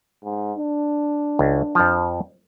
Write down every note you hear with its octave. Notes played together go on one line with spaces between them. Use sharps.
G#2
D4
C#2
F2 F3